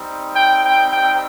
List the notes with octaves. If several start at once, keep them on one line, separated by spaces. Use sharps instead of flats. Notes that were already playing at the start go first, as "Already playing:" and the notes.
Already playing: G3 C4 D#4
G5
G5
G5